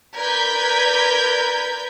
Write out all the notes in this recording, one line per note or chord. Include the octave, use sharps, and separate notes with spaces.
A#4 B4 D5 G6 G#6 B6